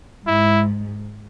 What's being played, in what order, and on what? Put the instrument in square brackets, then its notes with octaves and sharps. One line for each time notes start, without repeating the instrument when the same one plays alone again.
[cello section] G#2 [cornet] E4